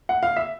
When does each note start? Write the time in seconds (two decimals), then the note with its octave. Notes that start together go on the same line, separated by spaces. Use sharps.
0.09 F#5
0.23 F5
0.36 E5